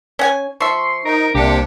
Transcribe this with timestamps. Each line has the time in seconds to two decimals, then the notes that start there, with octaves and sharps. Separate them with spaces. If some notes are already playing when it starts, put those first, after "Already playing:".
0.19 C#4 F#5 G#5
0.60 F3 E5 C6 C#6 C7 C#7
1.05 D#4 A#4
1.35 C2 C3 A#3 D4 G4 C#7